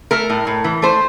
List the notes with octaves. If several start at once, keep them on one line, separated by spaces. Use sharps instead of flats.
A3 A#4
A2
A2
E3
A3 C5